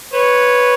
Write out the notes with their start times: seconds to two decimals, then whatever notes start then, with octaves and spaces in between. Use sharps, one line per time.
0.13 B4 C#5